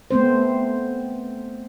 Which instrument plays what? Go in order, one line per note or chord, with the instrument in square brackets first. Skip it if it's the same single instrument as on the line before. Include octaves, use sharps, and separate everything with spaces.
[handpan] A3 B3 C4 C5